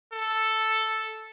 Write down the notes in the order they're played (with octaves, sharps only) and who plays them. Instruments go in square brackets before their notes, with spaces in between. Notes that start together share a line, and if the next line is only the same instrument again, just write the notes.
[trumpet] A4